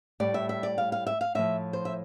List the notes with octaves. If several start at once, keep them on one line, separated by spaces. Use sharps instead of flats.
A2 G3 D5
E5
E5
D5
F5
F5
E5
F5
A2 F3 E5
C5
E5